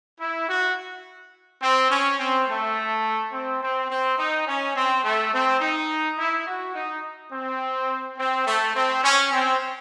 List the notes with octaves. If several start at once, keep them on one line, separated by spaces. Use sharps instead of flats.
E4
F#4
C4
C#4
C4
A3
C4
C4
C4
D#4
C#4
C4
A3
C4
D#4
E4
F#4
D#4
C4
C4
A3
C4
C#4
C4